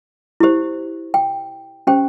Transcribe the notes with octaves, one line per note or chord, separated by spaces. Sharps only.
E4 G4 C5
G5
C#4 G4 C5 G5